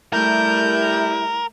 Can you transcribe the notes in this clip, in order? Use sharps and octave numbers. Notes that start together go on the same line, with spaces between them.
G3 A3 E4 A#4 G6